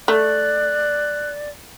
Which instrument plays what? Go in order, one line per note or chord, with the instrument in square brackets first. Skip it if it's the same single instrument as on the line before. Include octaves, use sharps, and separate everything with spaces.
[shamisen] A3 [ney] D5 [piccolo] F#6